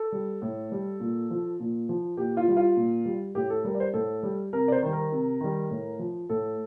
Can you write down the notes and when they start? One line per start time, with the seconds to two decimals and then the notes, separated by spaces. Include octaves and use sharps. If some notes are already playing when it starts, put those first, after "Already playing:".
Already playing: A4
0.12 G3
0.42 A2
0.72 G3
1.00 A#2
1.30 F3
1.60 A#2
1.89 F3
2.17 A#2 G4
2.37 F4
2.48 G3
2.57 F4
2.76 A#2
3.05 G3
3.35 A2 G4
3.50 A4
3.64 G3 A#4
3.75 D5
3.80 C5
3.94 A2 A4
4.23 G3
4.53 C3 A#4
4.68 D5
4.72 C5
4.83 D#3 G3
4.93 A#4
5.12 C3
5.40 D#3 G3
5.70 A2
5.99 F3
6.29 A2 A4